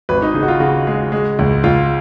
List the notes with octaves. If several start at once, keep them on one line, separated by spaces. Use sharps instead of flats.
G#1 B4
D#4
C#3 D#4
F#4
F4
C#3 F#4
G#3
G#3
C#2
C#2 F4